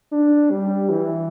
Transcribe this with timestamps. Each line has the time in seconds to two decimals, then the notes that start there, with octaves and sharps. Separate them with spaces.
0.12 D4
0.51 G3
0.90 E3